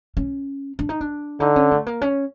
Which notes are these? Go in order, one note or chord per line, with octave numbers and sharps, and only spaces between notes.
C#4
D4
D#4
D4
D3 D#4
C#4
A3
A#3
C#4